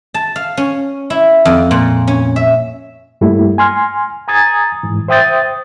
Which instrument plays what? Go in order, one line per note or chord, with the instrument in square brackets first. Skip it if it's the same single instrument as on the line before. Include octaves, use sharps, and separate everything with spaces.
[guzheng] A5
F5
C#4
E4
F2
A#2
C#4
E5
[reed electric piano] G2 G3 A3 A#3 E4
G#5 C6 F6
G#5 A#5 D#6 G#6 A6
G#2 E3
C5 E5 G5 D#6 G6 A6